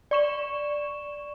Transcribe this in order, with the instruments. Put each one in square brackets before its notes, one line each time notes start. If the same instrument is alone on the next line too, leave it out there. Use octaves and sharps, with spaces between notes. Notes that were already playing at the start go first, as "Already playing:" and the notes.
[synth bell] D5 C#6 E7